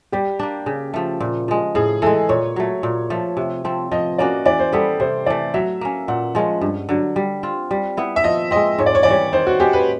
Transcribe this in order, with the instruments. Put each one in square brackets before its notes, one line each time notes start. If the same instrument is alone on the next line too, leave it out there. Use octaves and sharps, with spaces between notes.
[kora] G3 [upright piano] G4
[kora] A#3 D4
C#3
F3 A3
A#2
F3 G#3
[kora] A2 [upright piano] G#4
[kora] E3 G#3 [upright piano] A4
[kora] A#2 [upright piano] C#5
[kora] F#3 A3
A#2
F3 A3
C3
F3 A3 C4
[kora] F3 [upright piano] D#5
[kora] A#3 C#4 F#4 [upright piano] D5
[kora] E3 [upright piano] D5
[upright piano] C5
[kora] G3 B3 E4 [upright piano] A4
[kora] C3 [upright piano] C5
[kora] E3 A3 [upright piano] D5
[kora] F#3 [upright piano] E5
[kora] A#3 C#4
[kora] A#2 [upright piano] F#5
[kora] F3 G#3 C#4
G2
D3 F#3
G3
C4 F4
G3
B3 E4
[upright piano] E5
[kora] F3 [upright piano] D#5
[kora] G#3 C4 [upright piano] D#5
[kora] G#2 [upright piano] C#5
[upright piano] D5
C#5
[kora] E3 [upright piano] D5
[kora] G3 [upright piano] C#5
[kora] D#3 [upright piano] C5
[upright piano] F#4
[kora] G#3 C#4 [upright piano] G4
[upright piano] B4